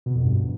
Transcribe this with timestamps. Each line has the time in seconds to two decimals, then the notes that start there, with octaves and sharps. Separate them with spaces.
0.06 B2
0.15 F2
0.24 G2